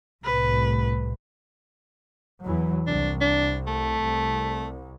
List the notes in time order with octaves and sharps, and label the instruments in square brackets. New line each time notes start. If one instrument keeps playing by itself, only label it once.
[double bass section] C2 A2 [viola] B4
[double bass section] E2 E3 F#3
[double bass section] C2 [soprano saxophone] D4
[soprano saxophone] D4
A3
[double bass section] C2